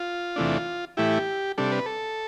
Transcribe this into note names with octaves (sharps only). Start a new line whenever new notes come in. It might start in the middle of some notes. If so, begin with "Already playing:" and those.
Already playing: F4
E2 C3 E3 A3 D4
A2 E3 A3 E4 G4
C3 G3 D4 A4
B4
A4